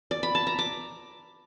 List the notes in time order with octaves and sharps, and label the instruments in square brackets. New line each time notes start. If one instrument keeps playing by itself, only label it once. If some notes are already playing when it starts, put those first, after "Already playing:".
[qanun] D5
B5
A5
A#5
D6